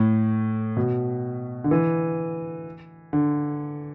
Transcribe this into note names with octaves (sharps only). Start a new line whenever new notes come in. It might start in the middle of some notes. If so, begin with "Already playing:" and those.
Already playing: A2
B2
D3
E3
D3